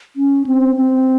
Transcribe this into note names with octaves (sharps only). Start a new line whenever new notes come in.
C#4
C4
C4